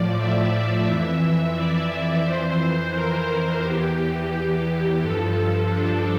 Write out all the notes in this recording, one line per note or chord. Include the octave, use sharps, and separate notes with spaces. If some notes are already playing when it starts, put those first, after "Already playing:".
Already playing: A2 F3 D5
E5
F2 E3
D5
F2 E3 C5
A#4
E2 E3 G4
G4
G2 F3 A4
D4